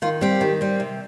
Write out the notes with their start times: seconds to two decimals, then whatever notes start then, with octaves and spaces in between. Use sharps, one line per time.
0.02 D#3 F4
0.21 G3 C4 G4
0.41 D#3
0.61 G3 C4
0.80 C3